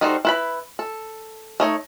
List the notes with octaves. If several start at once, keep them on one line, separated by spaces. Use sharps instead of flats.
G3 D#4 F#4 A4 C5
E4 B4 B5
A4
A3 D#4 C#5